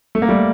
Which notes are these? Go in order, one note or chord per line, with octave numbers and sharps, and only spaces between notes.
A3
A#3
G3 A3